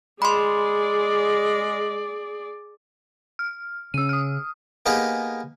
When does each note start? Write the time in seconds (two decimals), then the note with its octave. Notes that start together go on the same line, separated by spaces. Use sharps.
0.22 G#3 G#4 D5 B5 C6
3.39 F6
3.94 C#3 C#4 E6 D#7
4.09 D#6 F6
4.86 A#3 B3 D#4 G4 G#4